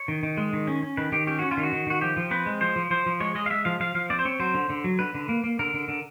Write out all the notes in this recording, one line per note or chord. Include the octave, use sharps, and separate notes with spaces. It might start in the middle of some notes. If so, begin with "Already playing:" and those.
Already playing: C#5
D#3
D#3
G#3
D#3
C#4
C#4
D#3 B4
D#3 G4
C#4 G4
C#4 F#4
F4
D#3
F#4
D#3
D#3 F#4
F3 G4
F3
C4 B4
G#3
F3 C5
F3
F3 C5
F3
G#3 C#5
G#3 D#5
F5
G#3 E5
F3 F5
F3 F5
F3 F5
C4 D5
C5
C4 C#5
F#3 C5
D3
D3
F#3
D3 B4
D3
A#3
A#3
D3 A#4
D3
D3